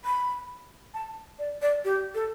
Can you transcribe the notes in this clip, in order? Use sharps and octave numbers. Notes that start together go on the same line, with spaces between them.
B5
A5
D5
D5
G4
A4